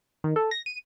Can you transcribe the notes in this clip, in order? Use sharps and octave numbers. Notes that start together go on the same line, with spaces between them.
D#3
A4
A#6
D#7